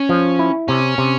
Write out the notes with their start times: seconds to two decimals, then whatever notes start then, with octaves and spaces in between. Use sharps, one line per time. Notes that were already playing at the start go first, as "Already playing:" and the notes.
Already playing: C#4
0.09 F3
0.39 E4
0.68 C3 C#4
0.98 C3